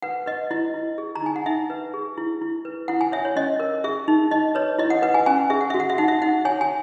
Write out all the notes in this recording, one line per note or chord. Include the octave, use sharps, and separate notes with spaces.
B4 F#5
B4 D#5
E4 D#5
E4
G#4
A#5
D#4 G#5
F#5
D#4 E5
B4
G#4
E4
E4
B4
E4 F#5
G#5
C#5 E5
C#5
C#4 D#5
A#4
G#4 E5
D#4
D#4 D#5
B4 C#5
E4 D#5
F#5
B4 F#5
G#5
C#4 G#5
G#4 E5
F#5
F#4 E5
F#5
E5
D#4 F#5
E5
D#4 F#5
C#5 G#5
G#5